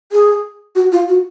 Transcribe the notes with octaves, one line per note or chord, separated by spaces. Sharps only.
G#4
F#4
F4
F#4